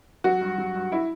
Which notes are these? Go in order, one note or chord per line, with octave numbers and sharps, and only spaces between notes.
F#3 F#4
G2
F#3
G2
E4